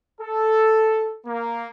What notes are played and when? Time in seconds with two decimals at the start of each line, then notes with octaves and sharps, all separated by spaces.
0.21 A4
1.26 A#3